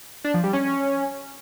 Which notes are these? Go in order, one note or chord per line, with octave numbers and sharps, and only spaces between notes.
D4
F3
G3
C#4